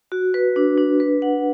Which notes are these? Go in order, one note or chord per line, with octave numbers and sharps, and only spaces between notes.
F#4
B4
D4
D4
B4
F#5